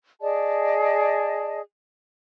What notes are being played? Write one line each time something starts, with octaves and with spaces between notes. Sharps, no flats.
G#4 D5 D#5 A5